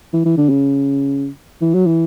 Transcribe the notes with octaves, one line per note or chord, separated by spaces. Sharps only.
E3
E3
D3
C#3
E3
F#3
E3